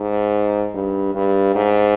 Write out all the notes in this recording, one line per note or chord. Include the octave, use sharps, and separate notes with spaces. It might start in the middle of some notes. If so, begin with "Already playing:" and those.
Already playing: G#2
G2
G2
G#2